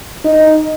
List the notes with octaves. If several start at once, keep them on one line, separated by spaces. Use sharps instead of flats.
D#4